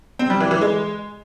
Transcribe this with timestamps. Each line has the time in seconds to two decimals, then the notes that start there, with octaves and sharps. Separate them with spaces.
0.19 C4
0.30 G3
0.40 E3
0.51 E3
0.61 G#3